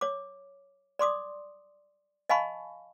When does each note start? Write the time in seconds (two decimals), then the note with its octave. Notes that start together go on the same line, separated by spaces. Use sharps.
0.01 C#5 D6
0.99 D5 C6 D6 D#6
2.29 D#5 F5 G#5 A5 B5 C#6